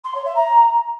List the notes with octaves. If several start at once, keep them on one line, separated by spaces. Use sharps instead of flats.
C6
C#5
E5
A#5